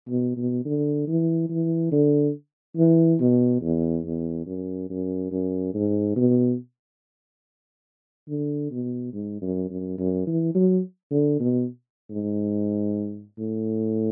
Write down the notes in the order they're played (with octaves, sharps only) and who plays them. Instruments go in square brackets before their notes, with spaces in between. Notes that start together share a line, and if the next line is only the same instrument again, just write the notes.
[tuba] B2
B2
D3
E3
E3
D3
E3
B2
E2
E2
F#2
F#2
F#2
G#2
B2
D3
B2
G#2
F#2
F#2
F#2
E3
F#3
D3
B2
G#2
A2